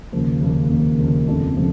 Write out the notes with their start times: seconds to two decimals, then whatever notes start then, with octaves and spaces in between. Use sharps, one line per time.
0.12 D#2 C#3 F3 A#3
0.41 D#2 C#3 F3 A#3
0.70 D#2 C#3 F3 A#3
0.99 D#2 C#3 F3 A#3
1.27 F2 C#3 F3 A3 D4
1.57 C#3 F3 A3